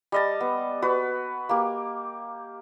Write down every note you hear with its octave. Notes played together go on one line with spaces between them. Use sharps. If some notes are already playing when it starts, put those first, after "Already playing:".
G3 D#5 A5
B3
F#4 B4
A#3 G4